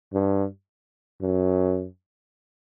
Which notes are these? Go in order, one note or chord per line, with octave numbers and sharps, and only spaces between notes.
G2
F#2